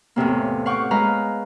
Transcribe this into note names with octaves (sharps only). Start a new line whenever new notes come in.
E2 A2 C3 A#3
F5 F#5 C#6 D6 G6
G#3 B4 F5 A#5